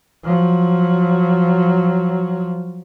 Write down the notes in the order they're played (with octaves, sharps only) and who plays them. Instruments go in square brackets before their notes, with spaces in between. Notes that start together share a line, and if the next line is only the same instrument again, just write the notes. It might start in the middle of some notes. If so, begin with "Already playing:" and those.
[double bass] F3 F#3